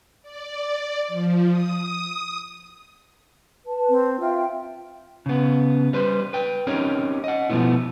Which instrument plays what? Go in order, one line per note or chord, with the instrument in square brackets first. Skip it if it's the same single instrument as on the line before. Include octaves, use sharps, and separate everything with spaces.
[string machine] D5
F3
D#6
[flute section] B4 A5
[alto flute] C4
[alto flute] F4 [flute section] E5 F5 G5
[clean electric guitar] C#3 B3
G3 B4 C5
B4 G5
C4 C#4 D#4 G4 A#4 C#5
D#5 F#5
B2 F3 G#3 A3 B3 E4